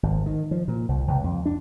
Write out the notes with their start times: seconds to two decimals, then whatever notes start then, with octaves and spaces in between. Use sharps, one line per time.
0.03 G#1
0.26 D#3
0.51 F3
0.68 A#2
0.89 C2
1.08 C#2
1.24 F2
1.46 D4